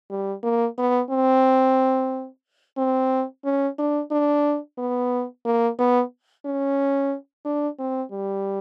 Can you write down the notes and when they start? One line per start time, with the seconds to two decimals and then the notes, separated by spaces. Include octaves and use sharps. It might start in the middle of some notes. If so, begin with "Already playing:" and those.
0.10 G3
0.43 A#3
0.78 B3
1.10 C4
2.78 C4
3.45 C#4
3.79 D4
4.12 D4
4.78 B3
5.46 A#3
5.79 B3
6.45 C#4
7.45 D4
7.79 C4
8.12 G3